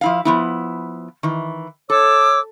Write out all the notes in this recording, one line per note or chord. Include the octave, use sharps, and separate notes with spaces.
F3 E4 F5
F3 B3 E4
D#3 E3
A4 C#5 D6 E6